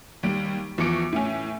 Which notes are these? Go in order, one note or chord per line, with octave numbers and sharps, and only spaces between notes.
D#2 G3 D7
E2 F3 C#6 D6 C#7 D7
A2 C#4